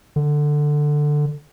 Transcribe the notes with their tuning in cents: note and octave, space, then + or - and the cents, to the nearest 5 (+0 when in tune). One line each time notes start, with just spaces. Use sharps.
D3 +10